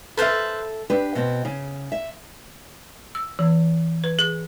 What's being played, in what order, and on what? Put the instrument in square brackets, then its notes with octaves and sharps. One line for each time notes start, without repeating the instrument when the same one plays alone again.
[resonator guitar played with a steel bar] A4 E5 [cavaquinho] B4 C5 F5
[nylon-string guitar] D4 G4 B4
B2 C4
C#3
E5
[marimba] E6
E3
B4
G#4